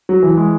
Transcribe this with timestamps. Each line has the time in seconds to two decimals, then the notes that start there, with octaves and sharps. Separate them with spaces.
0.09 F#3
0.23 E3
0.37 G#3